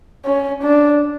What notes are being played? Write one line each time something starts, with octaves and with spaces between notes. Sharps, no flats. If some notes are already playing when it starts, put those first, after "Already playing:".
C#4
D4